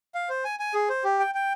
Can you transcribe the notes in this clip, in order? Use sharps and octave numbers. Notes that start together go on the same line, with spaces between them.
F5
C5
G#5
G#5
G#4
C5
G4
G5
G5